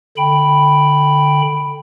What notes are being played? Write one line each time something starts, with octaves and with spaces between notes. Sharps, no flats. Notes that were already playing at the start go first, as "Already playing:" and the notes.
D3 G5 B5